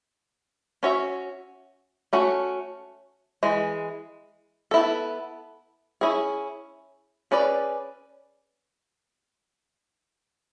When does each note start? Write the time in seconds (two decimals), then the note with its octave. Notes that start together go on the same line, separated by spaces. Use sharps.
0.83 C#4 F#4 C#5 E5
2.13 A3 C#4 F#4
3.43 E3 G#3
4.71 B3 E4 A4
6.01 C#4 E4 G#4
7.31 C#4 G#4 B4 D5